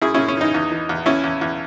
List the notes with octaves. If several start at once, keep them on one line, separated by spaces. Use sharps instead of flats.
F#2 E4 G#4
C#4 E4
F#2
C#4
E3 D#4
E2
E3
E2
E2 C#4 E4
E2
E2